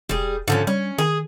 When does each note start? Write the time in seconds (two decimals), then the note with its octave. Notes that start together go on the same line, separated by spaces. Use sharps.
0.09 E1 G3 G#4
0.48 G#2 D3 F3 C#4
0.67 G3 C#4
0.98 D#3 G#4